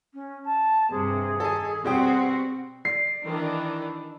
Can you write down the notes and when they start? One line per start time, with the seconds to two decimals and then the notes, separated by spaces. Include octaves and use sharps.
0.14 C#4
0.45 A5
0.91 G2 C3 G#4
1.40 D#3 A4 G#5
1.84 B2 G3 C4 F#4 G5
2.85 D5 C7
3.25 D#3 E3 D4